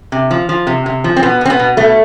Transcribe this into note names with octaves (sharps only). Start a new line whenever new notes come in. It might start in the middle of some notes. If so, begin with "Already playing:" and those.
C3
F3
F3
C3
C3
F3
C4
B2 B3
B2 C4
B3
B2
B2 A3